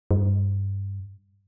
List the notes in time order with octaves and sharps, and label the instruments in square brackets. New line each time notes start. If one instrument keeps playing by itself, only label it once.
[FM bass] G2